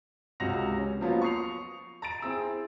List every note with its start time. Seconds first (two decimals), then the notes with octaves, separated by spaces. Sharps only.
0.40 C#2 C3 F#3 F#5 A#6 F7
0.78 C#4
1.01 F3 F#3 A#3 B3 F4
1.22 C#6 D#6 C7 F7
2.02 A#5 A6 D7
2.22 C4 E4 G#4 E6